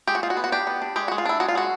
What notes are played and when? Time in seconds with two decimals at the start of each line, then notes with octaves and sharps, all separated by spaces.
0.07 G#3 G4
0.15 F#4
0.23 G#3 F4
0.30 F#4
0.37 B3
0.44 F#4
0.52 D4 G4
0.67 B3
0.82 D4
0.96 G#3 G4
1.08 G#3 F#4
1.18 F4
1.25 D4 E4
1.40 G#3 F#4
1.48 F4
1.55 G#3 F#4